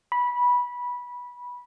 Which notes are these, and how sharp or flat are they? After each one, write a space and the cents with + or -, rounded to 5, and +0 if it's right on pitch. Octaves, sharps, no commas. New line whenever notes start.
B5 -15